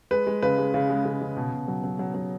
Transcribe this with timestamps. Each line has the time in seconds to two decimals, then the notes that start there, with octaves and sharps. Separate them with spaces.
0.11 G#3 B4
0.27 G#3
0.42 C#3 B4
0.58 G#3
0.74 C#3
0.90 G#3
1.05 C#3
1.21 C#3
1.37 B2
1.52 B2
1.68 F#3
1.84 F#3
1.99 F#3
2.14 F#3